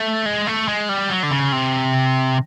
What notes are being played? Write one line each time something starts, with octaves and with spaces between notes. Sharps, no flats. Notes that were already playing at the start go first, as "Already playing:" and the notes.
Already playing: A3
G#3
A3
G#3
G3
F#3
D3
C#3
C3